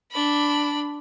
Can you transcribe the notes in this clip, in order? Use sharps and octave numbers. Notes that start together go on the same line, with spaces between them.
D4 B5